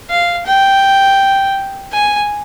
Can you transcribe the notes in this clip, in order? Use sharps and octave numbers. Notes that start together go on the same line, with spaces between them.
F5
G5
G#5